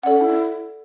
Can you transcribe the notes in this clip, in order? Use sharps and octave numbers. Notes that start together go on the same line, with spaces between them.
C#4 A4 D5 F#5
E4